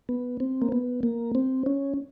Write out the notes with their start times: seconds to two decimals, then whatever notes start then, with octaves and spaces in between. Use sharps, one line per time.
0.09 B3
0.40 C4
0.62 A#3
0.72 B3
1.03 A#3
1.35 C4
1.66 C#4